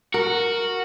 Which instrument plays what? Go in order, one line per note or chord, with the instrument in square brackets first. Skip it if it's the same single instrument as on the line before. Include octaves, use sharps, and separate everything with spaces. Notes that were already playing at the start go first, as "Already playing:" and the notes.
[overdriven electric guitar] F#4 [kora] A#4